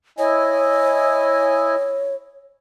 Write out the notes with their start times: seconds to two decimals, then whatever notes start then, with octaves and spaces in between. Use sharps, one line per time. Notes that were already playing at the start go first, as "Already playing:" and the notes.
0.18 E4 C#5 D#5 G#5